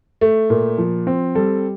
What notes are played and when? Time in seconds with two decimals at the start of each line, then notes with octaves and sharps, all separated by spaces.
0.21 A3
0.50 A#2
0.78 F3
1.07 C4
1.35 G3 A4